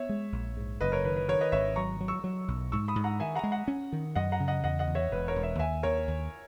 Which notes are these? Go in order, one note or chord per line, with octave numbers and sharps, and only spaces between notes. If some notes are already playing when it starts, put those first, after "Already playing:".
Already playing: B3 C#5 E5
G#3
A#1
G#2
F#1 B4 D#5
A#4 C#5
D#3 B4
B4
D#3 A#4 C#5
B4 D#5
G#1 C#5 E5
F#3 A#5 C#6
F#3
C#6 E6
F#3
B1
G#2 C#6 E6
B5 D#6
G#2
F#5 A#5
D#3 E5 G#5
F#5 A#5
G#3
F#5 A#5
C#4
D#3
F#2 D#5 F#5
F#5 A#5
C#3
D#5 F#5
E2 D#5 F#5
D#5 F#5
E2
C#5 E5
E1 B4
A#4 C#5
E1
C#5 E5
D#2 E5 G#5
D#2 A#4 C#5
D#2